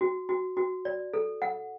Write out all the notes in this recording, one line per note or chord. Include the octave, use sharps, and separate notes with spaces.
F#4
F#4
F#4
D5
A4
F#5